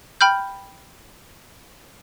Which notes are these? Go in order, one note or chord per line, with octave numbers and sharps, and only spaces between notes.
G5 B5 F6 G6